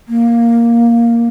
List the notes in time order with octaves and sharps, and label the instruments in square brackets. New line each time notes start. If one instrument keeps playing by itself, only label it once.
[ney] A#3